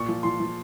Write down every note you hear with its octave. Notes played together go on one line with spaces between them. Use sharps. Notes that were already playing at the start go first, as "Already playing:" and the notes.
Already playing: A#2 C#6
F3
F3 C6
F3